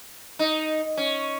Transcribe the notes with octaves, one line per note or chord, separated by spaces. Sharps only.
D#4
C#4